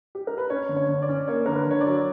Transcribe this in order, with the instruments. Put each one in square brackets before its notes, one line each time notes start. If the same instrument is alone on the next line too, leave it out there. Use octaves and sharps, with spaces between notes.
[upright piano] G4
A#4
B4
[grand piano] C#4 [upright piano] C#5
[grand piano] D3
[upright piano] C#5
[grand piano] D3
[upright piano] D5
[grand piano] C#4
[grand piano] A#3 [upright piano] C#5
[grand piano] D3 [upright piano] A#4
[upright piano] B4
[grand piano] D3 [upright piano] C#5
[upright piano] D5
[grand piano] F#3